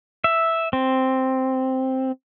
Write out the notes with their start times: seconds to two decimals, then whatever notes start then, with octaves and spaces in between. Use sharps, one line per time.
0.24 E5
0.73 C4